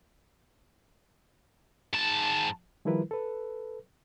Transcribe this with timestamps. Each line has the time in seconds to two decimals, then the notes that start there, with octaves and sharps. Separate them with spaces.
1.94 G#2 A5
2.85 D#3 F3 G3 E4 A#4 B4
3.11 A4 B4